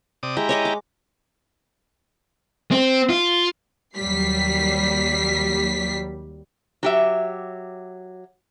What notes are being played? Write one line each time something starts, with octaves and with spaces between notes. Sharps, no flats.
C3 D5 D#6
G#3 E4 G4 A#5
C#5 D#5 D6
D6
C4
F4
D#2 F#3 G3 B6 C7
F#3 G4 E5